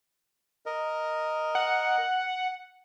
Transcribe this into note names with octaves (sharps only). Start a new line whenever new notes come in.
A#4 D#5
F#5